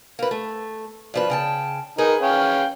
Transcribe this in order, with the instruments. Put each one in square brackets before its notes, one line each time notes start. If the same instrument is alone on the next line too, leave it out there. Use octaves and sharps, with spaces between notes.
[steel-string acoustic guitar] A#3 B4
A3
G2 F3 B4
C#3 G5 A5
[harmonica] D#4 A#4 [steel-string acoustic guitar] G#4 B4
[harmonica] C#4 F5 G5